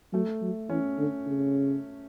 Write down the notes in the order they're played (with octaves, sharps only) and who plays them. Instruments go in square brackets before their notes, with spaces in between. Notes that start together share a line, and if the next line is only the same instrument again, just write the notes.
[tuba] F#3 [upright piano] A3
[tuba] F#3
[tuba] E3 [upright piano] C#4
[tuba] D3
C#3